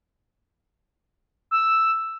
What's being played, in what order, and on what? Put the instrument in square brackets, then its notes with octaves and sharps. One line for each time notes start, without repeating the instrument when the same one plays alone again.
[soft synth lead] E6